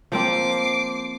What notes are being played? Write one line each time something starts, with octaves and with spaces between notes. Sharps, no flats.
F3 A#3 C4 D6 C7